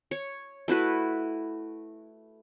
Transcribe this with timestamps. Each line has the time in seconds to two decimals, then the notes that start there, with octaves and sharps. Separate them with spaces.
0.11 C#5
0.68 A3 E4 F#4 B4